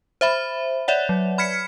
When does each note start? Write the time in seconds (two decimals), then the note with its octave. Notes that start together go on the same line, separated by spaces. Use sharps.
0.21 C5 E5 B5
0.88 C#5 D5 E5 F#5
1.09 F#3
1.38 B5 F6 G#6 B6 C#7